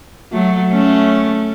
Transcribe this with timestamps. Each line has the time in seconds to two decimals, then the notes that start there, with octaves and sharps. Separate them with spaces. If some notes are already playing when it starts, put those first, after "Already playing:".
0.32 F#3 A3
0.72 A3 C#4